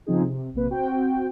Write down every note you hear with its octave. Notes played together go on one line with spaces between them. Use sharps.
C#3 F3 C4 D#4 G#4
C3
A#1 C3 A#3 B4
C4 F#4 G5